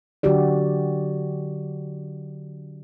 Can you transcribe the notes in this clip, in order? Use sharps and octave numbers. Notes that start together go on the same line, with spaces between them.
D3 F#3 F#4 G4 D5